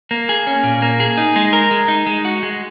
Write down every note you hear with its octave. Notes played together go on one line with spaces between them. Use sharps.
A#3
G#4
C#4
A#2
A#3
G#4
D#4
G#3
A#4
G#3
D#4
G#3
F#4
G#3